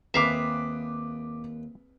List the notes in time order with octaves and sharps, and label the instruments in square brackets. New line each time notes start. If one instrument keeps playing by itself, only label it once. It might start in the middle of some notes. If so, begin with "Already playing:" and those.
[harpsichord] D#2 [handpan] C4 G#4 B4 [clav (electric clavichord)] E5 F5 [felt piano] D6 B6